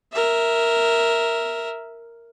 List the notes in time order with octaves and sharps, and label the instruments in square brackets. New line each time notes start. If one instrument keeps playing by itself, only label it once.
[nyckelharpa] A#4 E5